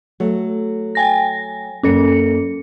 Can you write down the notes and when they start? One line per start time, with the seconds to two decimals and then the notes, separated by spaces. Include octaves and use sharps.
0.20 F#3 A3
0.95 G5 G#5 A#6
1.83 F#2 A#3 C#4 A4 C#7